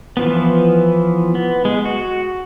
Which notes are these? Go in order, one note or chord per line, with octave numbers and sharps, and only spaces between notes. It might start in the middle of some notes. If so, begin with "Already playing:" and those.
E3 F3 B3
B3
G#3
F#4